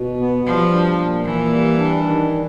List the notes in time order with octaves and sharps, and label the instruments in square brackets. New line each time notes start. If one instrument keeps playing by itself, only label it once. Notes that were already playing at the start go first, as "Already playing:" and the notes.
Already playing: [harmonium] B2
B3
[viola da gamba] F3 [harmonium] G3
[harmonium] D4
A#2
[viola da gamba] E3 [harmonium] A#3
[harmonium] G3
D4
D#3